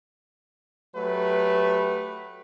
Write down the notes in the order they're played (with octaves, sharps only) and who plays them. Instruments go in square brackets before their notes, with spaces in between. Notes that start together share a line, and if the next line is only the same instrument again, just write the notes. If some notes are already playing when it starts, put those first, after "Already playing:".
[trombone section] F#3 A3 G4 B4